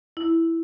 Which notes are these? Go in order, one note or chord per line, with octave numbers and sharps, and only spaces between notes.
E4